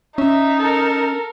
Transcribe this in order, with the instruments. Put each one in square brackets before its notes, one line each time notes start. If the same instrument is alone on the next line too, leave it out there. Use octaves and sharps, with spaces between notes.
[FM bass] C#4 [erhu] D#4 [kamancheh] E5
[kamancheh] A4 A#4